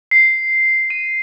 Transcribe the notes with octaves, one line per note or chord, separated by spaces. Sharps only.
C7
D#7